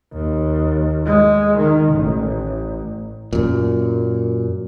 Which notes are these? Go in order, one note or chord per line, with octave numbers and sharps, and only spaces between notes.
D#2
G#3
D#3
A1
F#2 A#2